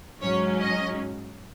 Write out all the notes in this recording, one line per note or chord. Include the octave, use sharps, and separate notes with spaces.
G#2 F#3 C#4 C#5
D#5